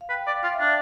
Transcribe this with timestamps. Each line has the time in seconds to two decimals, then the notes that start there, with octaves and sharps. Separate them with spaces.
0.01 F5
0.10 B4 G5
0.27 D5 F5
0.43 F4 F5
0.53 E5
0.60 D4 D5